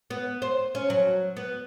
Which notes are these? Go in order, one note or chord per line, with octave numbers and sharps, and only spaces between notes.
B3
C5
C#4
F#3
B3